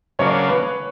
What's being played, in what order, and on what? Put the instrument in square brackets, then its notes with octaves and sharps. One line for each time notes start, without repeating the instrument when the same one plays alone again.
[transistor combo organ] C#3 F#3 A#3 D4 [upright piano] C#5
[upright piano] B4